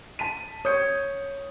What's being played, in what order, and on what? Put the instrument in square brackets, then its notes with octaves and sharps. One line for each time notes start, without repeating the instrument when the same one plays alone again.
[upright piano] A5 B6 D#7
[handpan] C#5 [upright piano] D#6 G6 C#7